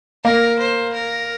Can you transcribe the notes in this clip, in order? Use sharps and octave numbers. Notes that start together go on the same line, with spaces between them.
A#3 A#4
C5
A#4